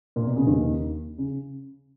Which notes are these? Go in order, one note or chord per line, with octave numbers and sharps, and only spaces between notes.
A#2
B2
C#3
D#2 D#3
C#3